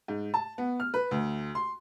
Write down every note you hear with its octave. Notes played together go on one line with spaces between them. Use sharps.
G#2
A5
B3
F6
B4
D2
C6